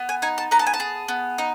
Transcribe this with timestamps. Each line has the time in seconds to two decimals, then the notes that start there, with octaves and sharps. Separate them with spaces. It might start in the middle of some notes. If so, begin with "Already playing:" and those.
Already playing: B3
0.09 G#5
0.22 D#4 G#5
0.38 A5
0.51 B3 A#5
0.59 A5
0.67 G#5
0.74 A5
0.80 G#4
1.08 B3
1.38 D#4